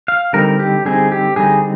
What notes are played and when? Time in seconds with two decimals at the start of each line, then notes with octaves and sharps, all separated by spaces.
0.08 F5
0.33 D3 G3 C4 D#4 A#4
0.59 G4
0.85 D3 G3 C4 D#4 G#4
1.12 G4
1.36 D3 G3 C4 D#4 G#4